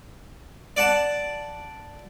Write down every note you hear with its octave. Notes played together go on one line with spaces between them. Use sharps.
D5 F#5 A5